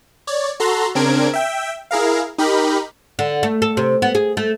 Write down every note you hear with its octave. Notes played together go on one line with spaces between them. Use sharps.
C#5 D5
F#4 A4 A#5 C6
C#3 C4 D4 A#4 G#6 D7
E5 G5
E4 G#4 A#4 F5
D#4 G4 A#4 B5
D3
A3
A4
C3
B3
G#4
A3